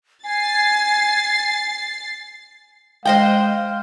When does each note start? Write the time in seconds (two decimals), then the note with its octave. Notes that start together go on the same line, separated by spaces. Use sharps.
0.24 G#5 A6 C7
3.05 G#3 C5 D#5 F5 G5